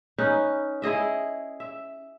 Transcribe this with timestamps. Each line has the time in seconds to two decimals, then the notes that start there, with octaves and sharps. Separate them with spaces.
0.18 C#4 D#4 B4
0.82 E4 G#4 D#5 E5
1.60 E5